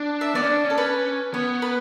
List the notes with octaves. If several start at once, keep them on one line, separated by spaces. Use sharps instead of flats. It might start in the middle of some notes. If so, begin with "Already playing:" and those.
Already playing: D4
E5
B3 D5
C#4
D4
C#4
A4
C#4 B4
B3 C#5
B4